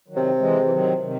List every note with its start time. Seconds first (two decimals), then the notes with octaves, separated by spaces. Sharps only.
0.08 D#3 F#3
0.16 C3
0.39 E3 G#3
0.62 E3
0.72 D#3 F#3
1.02 C3 D#3